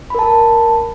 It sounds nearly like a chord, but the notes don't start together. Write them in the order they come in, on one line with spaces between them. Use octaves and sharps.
B5 A#4 A5